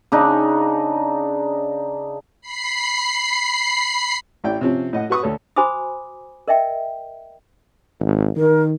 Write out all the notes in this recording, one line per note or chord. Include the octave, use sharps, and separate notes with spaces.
C#3 D4 D#4
B5 C7
A1 E4 D5 G5
C3 F3 C4 C#4
A2 D#5 F#5
F#4 B4 C#6 D#6
D2 A4 C#5
F#4 C5 G#5 B5 D6 D#6
A#4 D#5 E5 G5
G#1
D#3 A#4